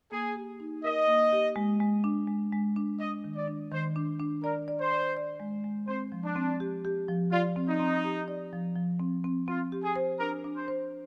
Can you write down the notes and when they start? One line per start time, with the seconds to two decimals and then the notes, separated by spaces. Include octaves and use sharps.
0.12 A#3 G#4
0.36 G4
0.60 D#4
0.84 A#4 D#5
1.08 A#3
1.32 G4
1.56 G#3
1.80 G#3
2.04 D4
2.27 G#3
2.52 G#3
2.76 D4
3.00 D4 D#5
3.24 D#3
3.37 D5
3.47 D4
3.71 D#3 C5
3.96 D4
4.19 D4
4.43 A#4 D5
4.68 D5
4.80 C5
4.92 D5
5.17 D5
5.40 G#3
5.64 G#3
5.88 C4 C5
6.12 F3
6.24 D4
6.36 C4
6.60 G4
6.85 G4
7.08 F3
7.32 F4 D5
7.56 C4
7.69 D#4
7.80 C4
8.04 G4
8.28 D5
8.53 F3
8.76 F3
9.00 C4
9.24 C4
9.48 C4 F4
9.72 G4
9.84 G#4
9.96 C5
10.20 D4 A#4
10.44 D4
10.57 C5
10.68 C5